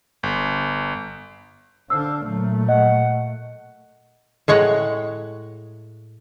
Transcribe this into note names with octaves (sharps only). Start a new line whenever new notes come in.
G1
D3 D4 A4 C5 F5 E6
A#2 F#3 A3
D#5 F#5
A2 G#3 C#5 F#5